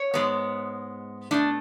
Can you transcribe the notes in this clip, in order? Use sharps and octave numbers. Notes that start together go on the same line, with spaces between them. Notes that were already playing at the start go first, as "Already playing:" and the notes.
Already playing: C#5
G#2 G#3 B3
B2 A3 D4